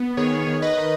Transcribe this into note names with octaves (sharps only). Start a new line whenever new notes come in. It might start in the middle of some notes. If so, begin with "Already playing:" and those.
Already playing: B3
D#3 G#4 C#5
D#3
B4 D#5
D#3